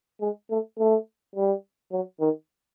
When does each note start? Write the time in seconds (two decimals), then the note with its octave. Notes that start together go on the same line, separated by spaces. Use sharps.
0.21 G#3
0.50 A3
0.79 A3
1.36 G3
1.92 F#3
2.21 D#3